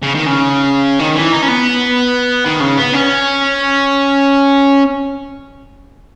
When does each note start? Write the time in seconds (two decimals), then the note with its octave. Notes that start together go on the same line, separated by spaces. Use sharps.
0.03 C#3
0.15 D#3
0.27 C#3
1.00 D#3
1.16 E3
1.33 D#4
1.43 C#4
1.48 B3
2.45 D#3
2.61 C#3
2.77 B3
2.93 C#4